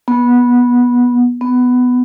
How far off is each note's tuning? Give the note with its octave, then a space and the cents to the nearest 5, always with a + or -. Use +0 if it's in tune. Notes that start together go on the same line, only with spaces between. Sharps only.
B3 -15
B3 +10